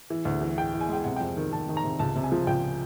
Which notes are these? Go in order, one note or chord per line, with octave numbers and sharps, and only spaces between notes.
E3
D2
E3
E3 G5
E3
G#5
G#3 G5
C3 F#5
F2 G5
D#3
D#3 A5
D#3
A#5
C3
C#2 A5
C3
G#5
F3
C#2 G5